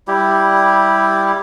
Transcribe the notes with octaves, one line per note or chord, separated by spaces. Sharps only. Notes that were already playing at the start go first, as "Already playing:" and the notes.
G3 E4 G4